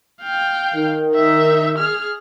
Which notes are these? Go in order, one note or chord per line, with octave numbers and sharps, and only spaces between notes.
F5 G5
D#3
D#4 E5
G#4 F6